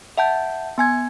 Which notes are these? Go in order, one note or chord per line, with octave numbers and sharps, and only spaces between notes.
E5 F#5 A5 G6
B3 G#5 G#6